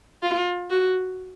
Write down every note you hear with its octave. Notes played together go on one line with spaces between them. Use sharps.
F4
F#4